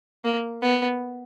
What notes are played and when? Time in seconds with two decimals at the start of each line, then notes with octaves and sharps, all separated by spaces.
0.24 A#3
0.62 B3